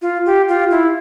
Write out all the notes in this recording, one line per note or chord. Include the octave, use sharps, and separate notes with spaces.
F4
G4
F4
E4